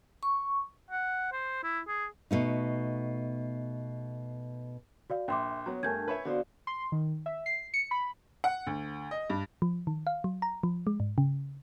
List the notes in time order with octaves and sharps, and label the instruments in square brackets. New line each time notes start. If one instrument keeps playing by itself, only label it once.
[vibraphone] C#6
[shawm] F#5
C5
E4
G#4
[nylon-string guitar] B2 A3 D#4
[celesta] F#4 D5 F5
[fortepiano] A#1 [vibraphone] E5 [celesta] G5 C6 D6
[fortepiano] F#3 B3 [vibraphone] C#5
[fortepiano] G2 A3 [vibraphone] D4 A#4 A5 [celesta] G#5 G6 G#6
[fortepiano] B4 C#5 E5
[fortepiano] D3 B3 C5 [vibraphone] F#4 D5 F5
[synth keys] C6
D#3
E5
C7
C#7
B5
[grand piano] F#5
D2
D#5
G2
[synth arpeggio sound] F3
D#3
F5
F#3
A#5
F3
G#3
G#2
C#3